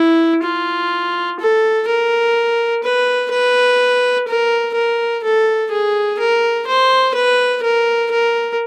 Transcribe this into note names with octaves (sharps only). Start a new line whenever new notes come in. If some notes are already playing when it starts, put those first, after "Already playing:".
Already playing: E4
F4
A4
A#4
B4
B4
A#4
A#4
A4
G#4
A#4
C5
B4
A#4
A#4